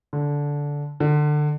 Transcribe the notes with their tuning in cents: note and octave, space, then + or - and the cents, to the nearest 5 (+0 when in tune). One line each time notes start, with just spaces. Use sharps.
D3 -15
D3 +25